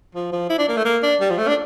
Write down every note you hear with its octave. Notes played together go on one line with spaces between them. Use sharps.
F3
F3
E4
D4
A#3
A3
A#3
D4
G3
F3
A3
D4